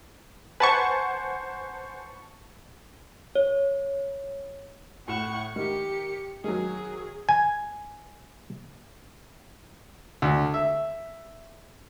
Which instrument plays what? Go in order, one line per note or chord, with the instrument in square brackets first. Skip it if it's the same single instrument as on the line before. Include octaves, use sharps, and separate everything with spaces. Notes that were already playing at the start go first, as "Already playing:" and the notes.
[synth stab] B4 A5 C#6 [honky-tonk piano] C5 F#5 G#5
[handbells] C#5
[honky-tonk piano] A2 E7 [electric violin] F#5 C#6
[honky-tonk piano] D#3 [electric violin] G4 C#7
[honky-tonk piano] D#3 F#3 [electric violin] G#4
[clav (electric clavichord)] G#5
[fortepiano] D2
E5